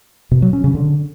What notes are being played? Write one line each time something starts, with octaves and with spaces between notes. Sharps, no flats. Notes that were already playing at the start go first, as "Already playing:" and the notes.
B2
F#3
C#4
C#3
D3